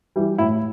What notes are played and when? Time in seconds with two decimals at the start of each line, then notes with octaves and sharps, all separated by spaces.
0.16 E3 G3
0.38 A2 E4